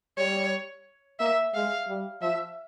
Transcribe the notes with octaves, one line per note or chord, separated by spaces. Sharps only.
G3 C#5
A#3 E5
G#3 F5
G3
F3 E5